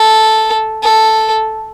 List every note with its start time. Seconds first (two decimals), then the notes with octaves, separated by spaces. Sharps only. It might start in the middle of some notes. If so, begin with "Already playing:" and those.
Already playing: A4
0.83 A4